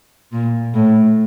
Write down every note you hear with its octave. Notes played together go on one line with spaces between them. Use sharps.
A#2
A2